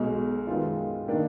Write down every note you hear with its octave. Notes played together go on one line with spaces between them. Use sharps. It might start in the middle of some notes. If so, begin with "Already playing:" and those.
Already playing: B1 B2 G#3
F#2 D#3 G#3 B3 F4
D#3 A#3 D4